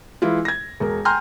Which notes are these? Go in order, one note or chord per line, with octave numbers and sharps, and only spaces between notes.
E3 G#3 E4 F4
G#6 A#6
E1 A#4
G5 G#5 A#5 C6 F6 G6